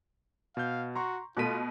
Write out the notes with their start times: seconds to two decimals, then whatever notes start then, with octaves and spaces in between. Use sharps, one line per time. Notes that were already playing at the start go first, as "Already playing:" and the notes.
0.57 B2 F5 G6
0.96 F#4 A#5 C6 C#6
1.37 B2 A3 F4 F#6 B6 D#7